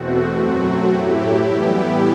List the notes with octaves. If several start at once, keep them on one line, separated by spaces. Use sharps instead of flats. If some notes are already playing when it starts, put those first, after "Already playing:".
Already playing: E2 B2 A3 C4 F#4
F#2 F#3 A3 C4
A2 F#3 A3 E4 G4
A2 E3 G3 B3